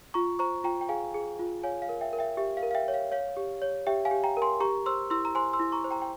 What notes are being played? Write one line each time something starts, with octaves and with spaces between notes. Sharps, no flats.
F4 A#5 C#6
C5 A#5 C#6
F4 G5 A#5
G5
G#4 F5 G#5
G#4
F4
C#5 F5 G#5
F5
A#4
E5 G5
A#4
E5 G5
G4 E5
F5
A#4
F5
E5 G5
C#5
F5
C#5 F5
G4
C#5
G4 E5 G5
F5 G#5
G4
G5 A#5
A#4
G#5 C6
G4 A#5 C#6
C5 C6 E6
E4 C6 E6
A#5
C5 G#5 C6
C6 E6
E4
A#5 C#6
C5
G5 A#5
G5